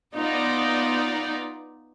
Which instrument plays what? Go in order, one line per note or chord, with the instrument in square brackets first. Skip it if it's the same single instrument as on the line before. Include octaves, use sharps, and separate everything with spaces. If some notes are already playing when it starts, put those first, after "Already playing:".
[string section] B3 D#4 F4 D5